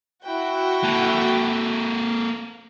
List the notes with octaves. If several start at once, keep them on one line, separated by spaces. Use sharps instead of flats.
E4 F#4 G5
A#3 A4